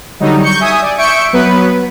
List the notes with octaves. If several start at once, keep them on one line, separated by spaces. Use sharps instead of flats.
D3 F#3 G3 D#4
C#6 G6 C#7
E5 G#5 D#6
D5
E5 C#6 G6 C#7 D7
F#3 B3 B4